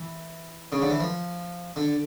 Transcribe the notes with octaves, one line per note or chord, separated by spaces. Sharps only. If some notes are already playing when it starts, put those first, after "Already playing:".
Already playing: E3
C#3
D3
E3
F3
D3